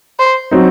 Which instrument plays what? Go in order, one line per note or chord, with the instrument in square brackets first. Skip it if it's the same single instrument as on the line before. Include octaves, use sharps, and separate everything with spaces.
[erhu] C5
[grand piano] F#3 C4 D#4